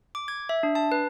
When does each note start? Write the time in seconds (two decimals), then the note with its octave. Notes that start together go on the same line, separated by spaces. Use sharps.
0.15 D6
0.28 G#6
0.49 E5
0.63 D4
0.75 A5
0.92 B4